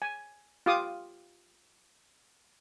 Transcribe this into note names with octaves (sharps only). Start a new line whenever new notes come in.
G#5
F4 G4 F5 D6 D#6